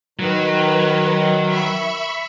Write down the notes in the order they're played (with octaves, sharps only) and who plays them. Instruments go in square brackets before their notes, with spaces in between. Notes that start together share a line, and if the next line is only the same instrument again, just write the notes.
[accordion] D#3 [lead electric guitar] F#3 [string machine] B4
[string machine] E5 B5 C#6